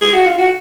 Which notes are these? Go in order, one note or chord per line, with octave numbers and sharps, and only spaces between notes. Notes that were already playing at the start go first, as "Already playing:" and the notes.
G#4
F#4
F4
F#4